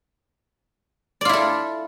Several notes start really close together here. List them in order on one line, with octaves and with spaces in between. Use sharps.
D5 F4 E4 A4